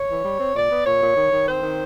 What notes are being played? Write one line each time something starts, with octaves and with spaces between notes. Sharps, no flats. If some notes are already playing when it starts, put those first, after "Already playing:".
Already playing: C#5
E3
G3
C4
A#2 D5
B3
A#2 C#5
A#2
D#3
D#3
C4 C5
D#3